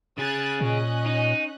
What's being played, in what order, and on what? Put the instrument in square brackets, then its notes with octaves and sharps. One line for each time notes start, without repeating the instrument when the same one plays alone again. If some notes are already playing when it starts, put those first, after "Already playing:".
[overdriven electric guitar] C#3 G#4 [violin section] F#6 G#6 A6
[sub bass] A#2 [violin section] C#4 D#5 F#6
[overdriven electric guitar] D#4